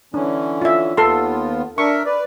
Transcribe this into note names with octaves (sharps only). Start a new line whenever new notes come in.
D3 E3 C#4 D4
F4 E5
D#2 B3 F4 A4 C6
D4 A#4 E5 C#6
B4 D5